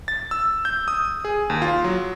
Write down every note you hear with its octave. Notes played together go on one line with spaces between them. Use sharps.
A6
E6
G6
D#6
G#4
D#2
F4
F#3